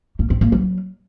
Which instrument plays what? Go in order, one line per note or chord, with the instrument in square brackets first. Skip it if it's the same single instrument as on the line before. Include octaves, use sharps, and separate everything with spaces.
[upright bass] A#3
C4
A#3
F#3